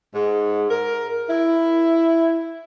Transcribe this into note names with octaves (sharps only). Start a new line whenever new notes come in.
G#2
A#4
E4